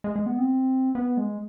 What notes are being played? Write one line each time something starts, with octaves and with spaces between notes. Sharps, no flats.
G#3
G#3
B3
C4
B3
G#3